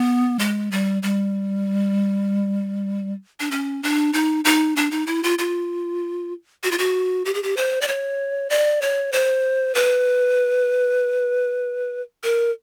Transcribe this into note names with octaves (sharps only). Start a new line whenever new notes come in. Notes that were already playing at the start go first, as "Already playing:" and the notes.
Already playing: B3
G#3
G3
G3
D4
C#4
D4
D#4
D#4
D4
D#4
E4
F4
F4
F#4
F4
F#4
G4
G#4
G4
C5
D5
C#5
D5
C#5
C5
B4
A#4